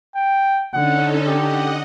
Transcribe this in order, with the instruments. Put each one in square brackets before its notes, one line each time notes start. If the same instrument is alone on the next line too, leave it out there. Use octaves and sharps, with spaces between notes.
[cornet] G5
[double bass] D3 [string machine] C#4 D#4 A4 [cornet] F#5
[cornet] G4 [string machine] D#5 F#5